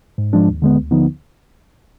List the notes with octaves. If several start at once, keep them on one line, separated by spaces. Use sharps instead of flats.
G#2
F3 G#3 D4
D#2
D3 G#3 B3
D2
D3 F3 B3 D#4